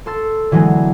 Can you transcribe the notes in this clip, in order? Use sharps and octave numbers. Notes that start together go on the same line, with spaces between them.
A4 C6 E6 A6
D3 E3 F#3 G#3 B3 G#4